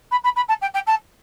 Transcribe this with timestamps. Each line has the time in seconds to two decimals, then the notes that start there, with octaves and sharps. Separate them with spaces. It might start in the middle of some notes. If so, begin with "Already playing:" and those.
0.11 B5
0.24 B5
0.36 B5
0.48 A5
0.61 G5
0.74 G5
0.87 A5